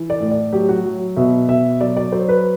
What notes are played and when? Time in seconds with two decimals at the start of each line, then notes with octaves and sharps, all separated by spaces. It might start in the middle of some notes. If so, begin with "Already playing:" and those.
Already playing: E3
0.10 D5
0.21 A2
0.31 D5
0.53 F#3 G4
0.69 F#4
0.84 F#3
1.17 B2 E5
1.48 B2 E5
1.80 F#3 D5
1.97 D5
2.12 F#3 C5
2.29 B4